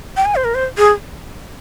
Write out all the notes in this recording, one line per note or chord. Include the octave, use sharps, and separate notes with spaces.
G5
G#5
C5
A#4
C5
G#4